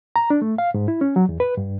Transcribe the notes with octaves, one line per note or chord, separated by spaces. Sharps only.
A#5
D4
A3
F5
G#2
E4
C#4
F#3
E2
B4
G2